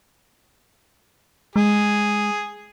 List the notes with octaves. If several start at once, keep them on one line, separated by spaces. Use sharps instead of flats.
G#3 G#4